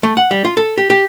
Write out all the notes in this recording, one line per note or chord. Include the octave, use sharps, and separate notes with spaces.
A3
F#5
G3
F4
A4
G4
G4